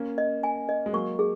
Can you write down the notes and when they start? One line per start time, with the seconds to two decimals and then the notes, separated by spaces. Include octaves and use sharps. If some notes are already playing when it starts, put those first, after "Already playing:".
Already playing: A#3 C#4
0.18 D#5
0.43 G#5
0.69 D#5
0.86 G#3
0.93 F#3 A#3 C#6
1.19 G#4